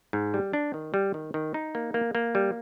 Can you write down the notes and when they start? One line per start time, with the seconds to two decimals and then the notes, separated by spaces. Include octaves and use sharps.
0.13 G#2
0.34 G3
0.53 D4
0.74 D#3
0.94 G3
1.14 D#3
1.34 D#3
1.54 D#4
1.75 A#3
1.94 A#3
2.15 A#3
2.35 G3